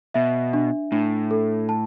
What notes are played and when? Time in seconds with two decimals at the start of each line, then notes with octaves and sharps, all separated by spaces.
0.14 B2 E5
0.53 D4
0.92 A2 D4
1.31 A4
1.69 A5